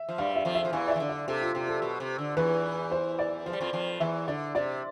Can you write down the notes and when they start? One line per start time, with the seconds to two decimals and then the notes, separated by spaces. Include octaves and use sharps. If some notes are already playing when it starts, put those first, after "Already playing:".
Already playing: E5
0.09 F3
0.18 G2 G3 F5
0.36 E5
0.45 F2 F3
0.55 E5
0.65 F3
0.73 E2 E3 F5
0.87 D5
0.90 E5
0.96 E3
1.00 D3
1.09 D5
1.28 C3 A4
1.41 F4
1.55 C3 G4
1.68 A4
1.82 B2
2.00 C3
2.18 D3
2.37 E2 E3 B4
2.91 C5
3.19 D5
3.46 F3 C5
3.53 G3
3.61 F2 F3
3.73 F2 F3
4.00 E2 E3 E5
4.27 D3 D5
4.55 C3 D5